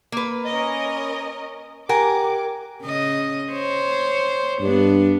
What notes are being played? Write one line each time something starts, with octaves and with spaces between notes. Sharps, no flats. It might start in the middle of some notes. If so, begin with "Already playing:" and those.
A#3 B4
C#4 A#4 D#5
G4 A#4 F#5 G#5 D6
C#3 D#5
C5 C#5
G2 B3 D4